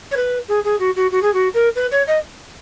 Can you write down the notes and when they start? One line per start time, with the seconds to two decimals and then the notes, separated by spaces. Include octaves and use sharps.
0.11 C#5
0.16 B4
0.48 G#4
0.64 G#4
0.79 F#4
0.96 F#4
1.11 F#4
1.22 G#4
1.33 F#4
1.54 A#4
1.75 B4
1.91 C#5
2.07 D#5